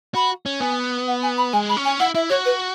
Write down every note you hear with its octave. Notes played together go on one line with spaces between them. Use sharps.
F#4 B5
C#4
B3 G#5
F#5
G#5
B5
G#3 G#5
B5
C#4
G#5
E4 F#5
E4 E5
F#4 C#5
B4